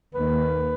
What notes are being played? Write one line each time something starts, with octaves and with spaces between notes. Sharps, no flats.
D#2 D#3 A#3 B4